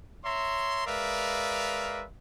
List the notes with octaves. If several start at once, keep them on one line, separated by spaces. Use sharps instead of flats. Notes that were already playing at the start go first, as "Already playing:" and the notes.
C#5 E5 A#5 C6
G#3 A#4 B4 D5 E5 F5